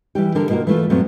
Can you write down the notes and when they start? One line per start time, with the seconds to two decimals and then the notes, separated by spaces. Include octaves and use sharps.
0.15 E3 G3 G4
0.35 D3 D4 A4 A#4
0.49 B2 A#3 F4 F#4 A#4
0.67 E3 A3 F4
0.90 F#2 A#2 F#3 A3 B3 C4